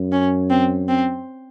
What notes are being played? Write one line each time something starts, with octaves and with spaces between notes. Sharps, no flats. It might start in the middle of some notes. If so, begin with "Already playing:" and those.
Already playing: F#2
C#4
C4
C4